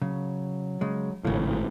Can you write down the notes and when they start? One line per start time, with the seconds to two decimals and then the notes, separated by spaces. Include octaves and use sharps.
0.02 C#3 F#3
0.81 C#3 G#3
1.25 G#1 A2 C#3 F3